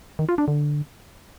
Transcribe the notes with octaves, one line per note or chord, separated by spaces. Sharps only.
D#3
F4
D4
D3